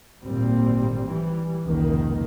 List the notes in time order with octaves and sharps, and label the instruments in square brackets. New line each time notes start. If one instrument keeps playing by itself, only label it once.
[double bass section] G#1 D2 A#2 G3 C4
E3 G3
F1 C#2 A#2 D#3 A#3